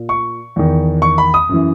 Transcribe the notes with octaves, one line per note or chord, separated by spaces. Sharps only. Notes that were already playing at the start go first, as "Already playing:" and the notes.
Already playing: A#2
C#6
E2 D#3
C#6
B5
D#6
F#2 E3